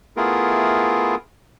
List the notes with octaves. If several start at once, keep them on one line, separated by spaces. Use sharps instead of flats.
A3 B3 E4 F4 G#4 A#4